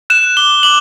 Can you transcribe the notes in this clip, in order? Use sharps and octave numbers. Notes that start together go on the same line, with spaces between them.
F#6 E7
D6 G7
D6 F#7